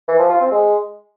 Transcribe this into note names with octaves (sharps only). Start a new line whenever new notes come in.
E3
F3
F4
C4
G#3